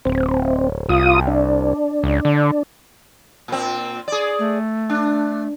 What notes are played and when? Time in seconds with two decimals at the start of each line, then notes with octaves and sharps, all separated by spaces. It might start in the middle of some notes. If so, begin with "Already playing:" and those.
0.05 D1 C4
0.89 C2 F4 D#6
1.27 D4
2.04 C#2
2.25 D3
3.48 A#2 C4
4.08 G#4 D5
4.39 A3
4.90 D4